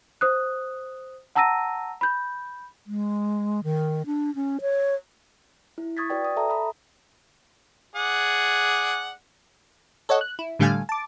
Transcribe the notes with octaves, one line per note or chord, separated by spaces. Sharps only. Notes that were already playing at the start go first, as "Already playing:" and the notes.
C5 D#6 F#6
F#5 A5 A#5 E6 A#6 D#7
B5 G6
G#3
D#3
D4
C#4
C#5
E4
C#6 D#6 G#6 A6 B6
F#4 B4 D5 G5
D#6
A4 E5 A5 A#5 D#6
B5 D#6
G#4 D5 F#5
A4 C#5 D#5 F#5
F#6
E4
A2 D3 G3 A3 F5 G#5
A5 D6